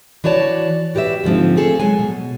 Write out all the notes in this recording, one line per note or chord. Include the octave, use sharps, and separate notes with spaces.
E3 F#4 C#5 D5 A5
F#4 G4 B4 D#5 E5
G#2 D3 F3 C4
A3 C4 G#4 A4
F#3 G#3 G#5
B2